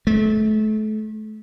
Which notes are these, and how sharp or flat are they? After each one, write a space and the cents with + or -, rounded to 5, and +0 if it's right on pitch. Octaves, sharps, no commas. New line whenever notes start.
A3 -35